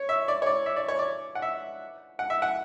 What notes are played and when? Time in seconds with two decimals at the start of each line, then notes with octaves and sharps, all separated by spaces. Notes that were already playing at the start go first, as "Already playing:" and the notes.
Already playing: C#5
0.09 E5
0.28 D5
0.42 C#5
0.46 D5
0.66 E5
0.76 D5
0.88 C#5
0.99 D5
1.35 F#5
1.42 E5
2.19 F#5
2.30 E5
2.42 F#5